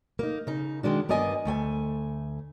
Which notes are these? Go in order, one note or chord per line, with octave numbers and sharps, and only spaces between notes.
A#3 D#4
C#3 D#4
D#3 G#3 D4 F#4
G2 A#3 B3 D5 D#5 G#5
D2 A3 G5 G#5